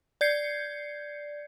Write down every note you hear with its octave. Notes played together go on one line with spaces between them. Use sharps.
D5 G6 G#6 C7 C#7